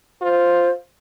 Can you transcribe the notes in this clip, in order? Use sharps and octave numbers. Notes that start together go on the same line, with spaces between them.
F4 C5